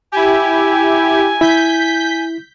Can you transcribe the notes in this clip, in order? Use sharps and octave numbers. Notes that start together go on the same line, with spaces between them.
E4 G4 G#5
E4 G6 B6